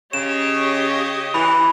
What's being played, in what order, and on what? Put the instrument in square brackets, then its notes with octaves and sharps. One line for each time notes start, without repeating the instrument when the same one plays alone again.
[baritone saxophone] C#3 [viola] G4 D#5 [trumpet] C#5 [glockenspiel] E7
[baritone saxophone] E3 [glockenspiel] B5